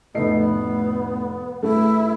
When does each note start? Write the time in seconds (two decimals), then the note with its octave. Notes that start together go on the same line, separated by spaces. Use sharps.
0.14 F1 A2 A3 B3 D#5 C7
1.63 G2 A3 E4